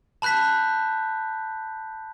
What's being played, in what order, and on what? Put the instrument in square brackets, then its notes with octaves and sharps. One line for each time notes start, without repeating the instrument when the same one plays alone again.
[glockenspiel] A5 B5 F#6 G6 B6